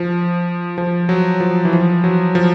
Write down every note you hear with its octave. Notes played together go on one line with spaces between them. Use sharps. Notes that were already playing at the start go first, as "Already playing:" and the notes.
Already playing: F3
F3
F#3
F3
E3
F3
F#3
F3